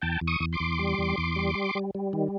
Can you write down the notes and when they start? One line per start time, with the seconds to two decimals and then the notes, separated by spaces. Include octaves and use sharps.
0.02 E2 G5 A5
0.21 E2
0.27 C#6 D#6
0.40 E2
0.53 C6 D6
0.60 E2
0.79 G3
0.98 E2
1.18 E2
1.36 G3
1.55 G3
1.75 G3
1.95 G3
2.13 D#3